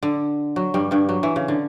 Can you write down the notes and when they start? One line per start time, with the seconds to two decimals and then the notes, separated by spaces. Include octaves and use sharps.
0.03 D3
0.56 F#3
0.74 G2 G3
0.91 G2 G3
1.09 F#3
1.23 E3
1.36 C#3
1.48 D3